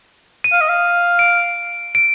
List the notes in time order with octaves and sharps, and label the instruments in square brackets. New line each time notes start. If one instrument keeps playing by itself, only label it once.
[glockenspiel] D#7
[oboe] F5
D#5
F5
[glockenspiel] D7
D7